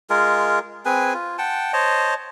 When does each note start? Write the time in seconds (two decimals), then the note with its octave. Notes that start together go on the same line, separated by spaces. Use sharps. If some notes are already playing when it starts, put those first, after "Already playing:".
0.10 G#3 F4 G#4 A#4
0.85 C4 G#4 B4 G#5
1.14 F4
1.38 F#5 G5 A5
1.73 C5 C#5 D#5 A5